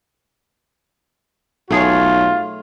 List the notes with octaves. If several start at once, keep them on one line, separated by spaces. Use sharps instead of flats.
B1 A3 F4 G#4 C#5